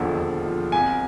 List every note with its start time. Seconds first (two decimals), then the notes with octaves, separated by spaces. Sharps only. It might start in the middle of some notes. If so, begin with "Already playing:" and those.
Already playing: E1 D#2 D3 F3
0.19 E1
0.46 F3
0.72 C2 G#5